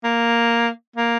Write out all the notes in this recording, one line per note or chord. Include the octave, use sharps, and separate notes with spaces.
A#3
A#3